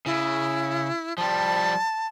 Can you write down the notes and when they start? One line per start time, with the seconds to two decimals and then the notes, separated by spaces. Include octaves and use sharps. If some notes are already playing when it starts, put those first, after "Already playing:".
0.06 C#3 E4
1.18 F3 G3 A5